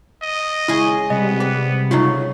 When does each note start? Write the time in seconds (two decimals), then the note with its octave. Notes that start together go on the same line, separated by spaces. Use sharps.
0.22 D#5
0.68 C#3 G#3 E4 G#5
1.10 C3 G3 B3 D#5
1.40 G4 B4
1.91 C#3 F#3 A3 D#4 F4